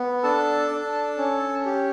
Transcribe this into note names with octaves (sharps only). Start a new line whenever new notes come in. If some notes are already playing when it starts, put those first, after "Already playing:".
Already playing: B3
D4 A4 A5
D4
C#4
G4